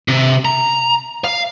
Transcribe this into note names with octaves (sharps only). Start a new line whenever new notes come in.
C3
A#5
F5